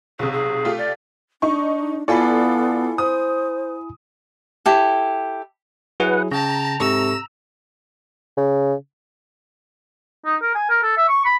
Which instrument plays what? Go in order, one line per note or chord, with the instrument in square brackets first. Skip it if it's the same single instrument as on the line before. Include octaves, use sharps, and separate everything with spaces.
[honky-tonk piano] B1 C3 [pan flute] G#4
[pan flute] G#4
[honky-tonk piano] A3 F4 G4
[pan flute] D5
[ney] D4 [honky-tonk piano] D#4 C#6
[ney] B3 [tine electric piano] E4 G#5 B5 [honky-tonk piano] F4 A4 D5
[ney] C5 [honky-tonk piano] D#6
[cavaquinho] E4 G4 A4
[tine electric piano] F#3 E4 G#4 [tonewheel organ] B4 F#5
[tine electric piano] C#3 [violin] G5 A5 [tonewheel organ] A#5
[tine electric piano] G#2 A4 C#6 [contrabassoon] C3 [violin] E6
[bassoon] C#3
[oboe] D#4
A#4
G#5
A#4
A4
E5
C#6
B5